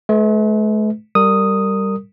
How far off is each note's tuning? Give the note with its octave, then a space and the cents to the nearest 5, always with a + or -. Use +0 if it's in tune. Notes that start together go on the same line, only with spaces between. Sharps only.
A3 -45 B4 +10
G3 +0 A#4 -30 D#6 +0